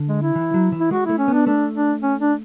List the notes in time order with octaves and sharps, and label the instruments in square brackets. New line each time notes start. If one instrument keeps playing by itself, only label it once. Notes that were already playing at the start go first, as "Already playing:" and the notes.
Already playing: [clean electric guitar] D3
[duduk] G#3
E4
[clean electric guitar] E3
F#3
E3
[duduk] E4
[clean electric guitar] G#3 [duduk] F#4
[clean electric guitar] A3 [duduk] E4
[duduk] C#4
[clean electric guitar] B3 [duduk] D4
[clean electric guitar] A3 [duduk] D4
[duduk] D4
C#4
D4